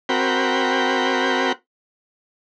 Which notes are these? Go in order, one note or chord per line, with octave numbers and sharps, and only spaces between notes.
C4 F#4 A#4 G5 B5